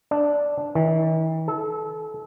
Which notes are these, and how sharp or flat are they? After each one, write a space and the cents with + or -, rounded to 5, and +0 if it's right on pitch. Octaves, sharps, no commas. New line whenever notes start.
D4 -5
E3 -45
A4 -30